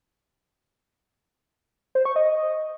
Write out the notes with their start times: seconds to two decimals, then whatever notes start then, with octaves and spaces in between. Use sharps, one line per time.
1.95 C5
2.05 C#6
2.16 D#5